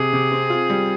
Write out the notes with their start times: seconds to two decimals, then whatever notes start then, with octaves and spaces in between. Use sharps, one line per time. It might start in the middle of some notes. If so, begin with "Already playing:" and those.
Already playing: C3 G#4
0.13 C3
0.32 C4
0.50 F4
0.70 G3